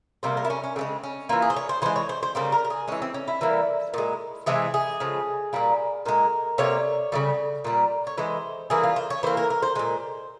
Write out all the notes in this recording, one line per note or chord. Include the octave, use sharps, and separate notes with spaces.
C3 G3 A#3 C5
A#4
E4
C#4
C#4
C#3 F3 G#3 C4
C#4
E3 A#3 F4
G#4
C5
C#5
C5
E3 G#3 C5
C#5
C5
C5
C#3 G3 A#3 C5
A#4
A#4
G#4
E3 G#3 C#4
C4
C#4
E4
E3 G3 A#3
A#2 G#3
C3 E3 G#3 G#4
G#4
C#3 F3 G#3
A#2 G3 A#3
A#2 G#3 A#4
C3 G3 A#3 C#5
C#3 E3 G3
A#2 G3 A#3
C#5
E3 G#3 C5
E3 G3 A#3 G#4
F4
C5
C#5
E3 A#3 C5
A#4
A#4
C5
A#2 G#3 C5